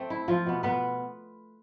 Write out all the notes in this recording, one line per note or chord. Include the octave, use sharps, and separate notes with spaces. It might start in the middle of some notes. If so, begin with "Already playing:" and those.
Already playing: A3 C4
E4
F3 F4
B2 B3
B3 B4